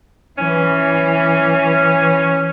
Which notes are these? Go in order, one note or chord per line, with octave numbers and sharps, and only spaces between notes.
E3 C#4